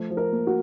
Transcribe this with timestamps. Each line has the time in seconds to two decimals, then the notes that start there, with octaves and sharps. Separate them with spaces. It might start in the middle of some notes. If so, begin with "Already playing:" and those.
Already playing: F3 A3
0.11 F3
0.17 A#4
0.32 A#3
0.47 F#4